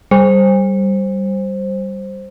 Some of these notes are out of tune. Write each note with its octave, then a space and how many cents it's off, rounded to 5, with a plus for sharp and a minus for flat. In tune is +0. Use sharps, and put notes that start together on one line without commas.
G3 -10 C5 +10